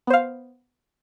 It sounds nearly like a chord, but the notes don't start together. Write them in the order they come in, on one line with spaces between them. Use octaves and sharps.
B3 C5 F5